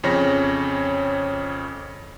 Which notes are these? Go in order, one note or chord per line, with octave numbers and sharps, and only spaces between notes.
F2 C#3 C#5 A#6